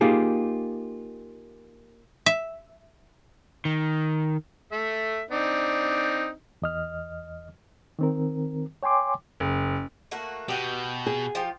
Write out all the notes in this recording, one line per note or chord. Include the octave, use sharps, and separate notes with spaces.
A#3 D#4 F4 G4 G#4
E5
D#3
A3 E5
C4 D4 D#4
E2 D#5 F6
D#3 C4 A#4
C#5 G5 G#5 C6 D6
F#1
A3 A#3 F#4
B2 F#4 G4
G#4
F3 F4 G4